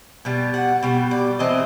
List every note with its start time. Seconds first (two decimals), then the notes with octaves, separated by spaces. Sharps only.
0.25 B2 G3
0.54 F#5
0.83 B2 G3 G5
1.11 D5
1.39 E3 A3 C4 D#5